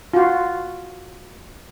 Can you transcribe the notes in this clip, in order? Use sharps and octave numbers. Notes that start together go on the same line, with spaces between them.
F4 F#4